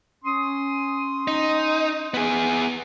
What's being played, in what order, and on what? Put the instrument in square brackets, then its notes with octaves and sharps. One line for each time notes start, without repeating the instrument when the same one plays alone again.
[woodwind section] C#4 C6 D#6
[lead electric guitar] D#4
B3 G#4